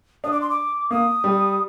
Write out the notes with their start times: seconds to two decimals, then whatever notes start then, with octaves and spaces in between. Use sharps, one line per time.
0.24 D4 D#6
0.32 D6
0.41 C6
0.50 D6
0.90 A#3 D#6
1.24 G3